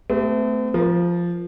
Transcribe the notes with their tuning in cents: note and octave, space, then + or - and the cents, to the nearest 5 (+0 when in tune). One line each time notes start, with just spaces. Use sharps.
A3 +0 C4 -45 G4 +0
F3 -5 A#4 +30